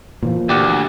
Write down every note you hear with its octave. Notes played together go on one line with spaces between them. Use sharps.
A#2 E3 F3
D2 G4 D5 F#5